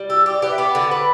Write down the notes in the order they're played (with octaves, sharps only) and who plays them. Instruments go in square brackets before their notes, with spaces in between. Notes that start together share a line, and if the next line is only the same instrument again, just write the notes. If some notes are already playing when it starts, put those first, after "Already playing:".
Already playing: [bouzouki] G3
[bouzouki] G4 [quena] E6
[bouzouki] G4 [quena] D6
[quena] D5
[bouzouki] G4 [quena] B4
[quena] E5
[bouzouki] B3 [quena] D6
[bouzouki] D3
[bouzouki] B4 [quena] B5